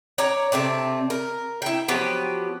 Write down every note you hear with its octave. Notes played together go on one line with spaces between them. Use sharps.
C#5 D5 A#5
C3 A3 C4 D5
A#4
E4 G5
F3 F#3 B3 G4